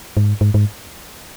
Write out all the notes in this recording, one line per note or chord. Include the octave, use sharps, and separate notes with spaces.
G#2
G#2
G#2